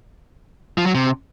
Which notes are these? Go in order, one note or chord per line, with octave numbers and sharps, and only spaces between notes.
F3
F#3
C3